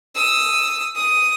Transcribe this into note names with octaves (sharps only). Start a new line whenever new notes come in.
D#6 E6
D#6